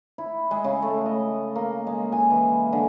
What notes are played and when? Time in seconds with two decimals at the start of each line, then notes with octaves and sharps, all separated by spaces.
0.18 E4
0.51 G#3
0.64 C#3
0.82 A3
1.06 D#5
1.56 A#3
1.87 G#3
2.12 G#5
2.30 E3
2.73 D3